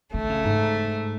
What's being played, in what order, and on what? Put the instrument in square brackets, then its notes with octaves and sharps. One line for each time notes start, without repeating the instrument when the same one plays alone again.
[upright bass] D3 [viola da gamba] A3
[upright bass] C#3
G#2